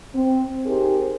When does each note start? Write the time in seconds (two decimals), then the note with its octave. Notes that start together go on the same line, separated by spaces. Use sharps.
0.15 C4
0.66 D#4 G4 G#4 A#4 C5